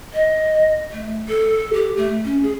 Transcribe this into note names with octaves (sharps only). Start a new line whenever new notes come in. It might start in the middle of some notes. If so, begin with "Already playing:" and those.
D#5
A3
A4
G4
A3
C#4
G#4